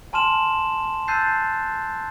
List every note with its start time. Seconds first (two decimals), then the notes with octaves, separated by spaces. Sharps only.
0.13 G#5 A5 C6 F6 E7 F#7
1.08 A5 E6 F#6 G6 A6 C7